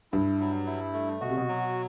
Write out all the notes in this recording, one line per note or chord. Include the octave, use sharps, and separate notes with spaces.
G2 E4
F#3
E4
A3
B2 F#4
C3
B2
F#3